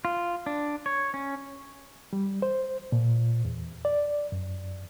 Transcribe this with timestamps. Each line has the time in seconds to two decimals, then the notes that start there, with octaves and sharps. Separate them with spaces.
0.05 F4
0.46 D4
0.86 C#5
1.14 C#4
2.13 G3
2.42 C5
2.92 A#2
3.45 E2
3.85 D5
4.32 F#2